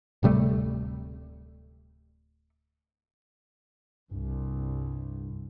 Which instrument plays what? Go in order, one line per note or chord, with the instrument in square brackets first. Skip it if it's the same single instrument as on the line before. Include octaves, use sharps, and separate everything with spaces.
[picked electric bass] D1 C3 G3 A3
[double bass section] C2 [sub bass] G2